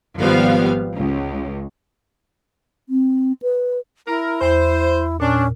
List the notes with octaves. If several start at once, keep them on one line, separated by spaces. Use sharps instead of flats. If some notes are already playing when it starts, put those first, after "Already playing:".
G#1 F3 G3 B3 F5
C#2
C4
B4
E4 A#4
E2 C5
A#2 C#4 D4